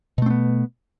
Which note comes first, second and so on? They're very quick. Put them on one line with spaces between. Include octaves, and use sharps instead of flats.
B2 A3 C4 B3